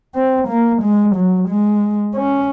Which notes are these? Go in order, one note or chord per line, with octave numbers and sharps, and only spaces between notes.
C4
A#3
G#3
F#3
G#3
C#4